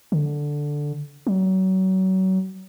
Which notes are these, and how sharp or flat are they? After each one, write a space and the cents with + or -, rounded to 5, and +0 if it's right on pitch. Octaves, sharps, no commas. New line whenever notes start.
D3 +0
F#3 +30